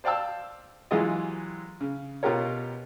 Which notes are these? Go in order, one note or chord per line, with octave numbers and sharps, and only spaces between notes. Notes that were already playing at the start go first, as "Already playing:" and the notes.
C5 D5 F5 G5 A5 E6
E3 F#3 G#3 F4 G4 D#5
C#3
B2 B3 F4 G4 A#4 C#5